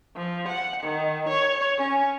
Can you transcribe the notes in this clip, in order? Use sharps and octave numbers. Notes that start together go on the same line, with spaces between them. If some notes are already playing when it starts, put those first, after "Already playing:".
F3
F#5
D#3
C#5
C#4